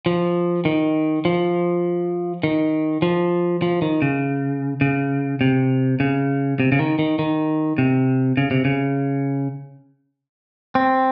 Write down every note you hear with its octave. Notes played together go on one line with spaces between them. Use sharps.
F3
D#3
F3
D#3
F3
F3
D#3
C#3
C#3
C3
C#3
C3
C#3
D#3
D#3
D#3
C3
C#3
C3
C#3
C4